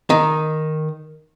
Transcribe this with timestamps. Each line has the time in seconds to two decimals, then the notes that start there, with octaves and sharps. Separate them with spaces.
0.10 D#3